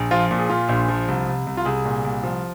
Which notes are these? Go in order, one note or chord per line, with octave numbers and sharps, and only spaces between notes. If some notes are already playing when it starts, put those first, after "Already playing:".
Already playing: A#1
F3 F4
A#2
G#4
A#2 F4
A#1
F3
C2
C2
C2
F4
C2 G#4
A#2
C2
F3